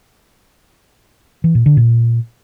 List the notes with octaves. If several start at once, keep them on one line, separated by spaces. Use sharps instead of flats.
E3
A#2
D3
A#2